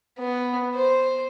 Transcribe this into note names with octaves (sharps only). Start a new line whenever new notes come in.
B3
C5